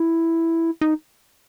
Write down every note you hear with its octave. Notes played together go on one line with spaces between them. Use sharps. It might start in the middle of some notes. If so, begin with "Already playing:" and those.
Already playing: E4
D#4